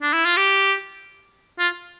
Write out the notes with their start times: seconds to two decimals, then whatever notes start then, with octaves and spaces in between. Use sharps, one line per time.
0.02 D4
0.13 E4
0.25 F4
0.37 G4
1.59 F4